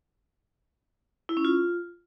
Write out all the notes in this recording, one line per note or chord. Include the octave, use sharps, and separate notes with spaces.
E4
C#4
F4